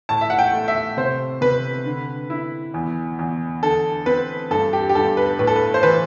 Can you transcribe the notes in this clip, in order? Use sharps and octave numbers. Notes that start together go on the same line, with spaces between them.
A2 A5
E5
F#5
G5
A3
E5
C3 C5
C3 B4
D3
E4
E2
E2
D3 A4
C4 B4
G2 A4
G4
G4
G2 A4
B4
A2 B4
A4
B4
C5
E3 B4